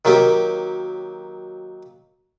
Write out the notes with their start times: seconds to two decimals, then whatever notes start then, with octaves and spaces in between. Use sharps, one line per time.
0.05 D#3 F#3 A#3 G4